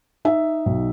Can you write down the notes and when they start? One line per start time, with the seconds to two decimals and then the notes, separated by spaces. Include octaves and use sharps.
0.25 D#4 E5
0.66 B1